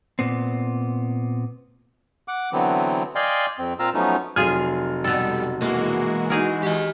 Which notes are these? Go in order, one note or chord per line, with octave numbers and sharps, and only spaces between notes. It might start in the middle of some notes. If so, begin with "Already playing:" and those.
A#2 B3 C4
F#5 D6
D3 E3 F#3 B3 C4
D5 D#5 F5 G5 G#5 C6
F2 C4
A#2 C4 F4 F5 A#5 E6
F3 F#3 A3 B3 C#4 D#4
F1 F#3 F4 G#4 G#5 F6
B2 G3 A4
E3 G#3 A#3 F#4
D#4 G#4 A#4
G4 D#5